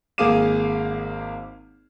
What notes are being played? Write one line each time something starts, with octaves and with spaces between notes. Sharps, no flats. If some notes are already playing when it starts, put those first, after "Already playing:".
G#1 A#3 G#4 F5 D6 D#7